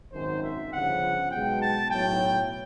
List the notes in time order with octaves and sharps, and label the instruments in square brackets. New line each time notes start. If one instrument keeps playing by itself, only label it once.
[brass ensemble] G#1 F#2 D#3 C5
E5
G1 F2 C#3 F3 F#5
B1 B2 G#3 G5
A5
B1 A2 F#3 G5